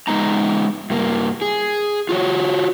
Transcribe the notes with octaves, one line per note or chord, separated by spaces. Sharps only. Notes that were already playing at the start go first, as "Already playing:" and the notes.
G#3 B3 D#4 A#5
G2 A#3
G#4
F4 F#4 C#5